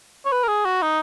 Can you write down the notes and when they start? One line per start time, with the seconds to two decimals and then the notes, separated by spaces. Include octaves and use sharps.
0.25 C#5
0.32 B4
0.43 A#4
0.48 G#4
0.65 F#4
0.82 D#4